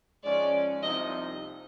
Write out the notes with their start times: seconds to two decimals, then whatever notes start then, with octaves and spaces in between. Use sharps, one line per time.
0.24 G#2 F3 G#3 C#4 D5
0.83 C2 C3 F3 A#3 D#4 D#5